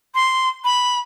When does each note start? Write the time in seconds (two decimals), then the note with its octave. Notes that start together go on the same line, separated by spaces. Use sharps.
0.15 C6
0.64 B5